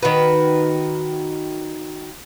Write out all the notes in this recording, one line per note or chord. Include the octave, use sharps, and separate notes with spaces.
D#3 F#4 B4